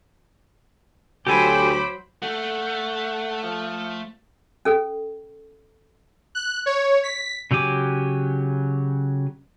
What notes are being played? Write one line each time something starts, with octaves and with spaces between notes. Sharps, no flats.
D2 F#3 G4 A4 C5 G#5 B5 D6
A3 F#5
F3
C#4 A4
F#6
C#5
B6
C#3 F#3 G4 G#5 D6